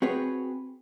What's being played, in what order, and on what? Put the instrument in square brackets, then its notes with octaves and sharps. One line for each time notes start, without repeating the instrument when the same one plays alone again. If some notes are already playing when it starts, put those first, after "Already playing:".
[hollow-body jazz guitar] C4 F#4 G#4 B4 C#5 F#5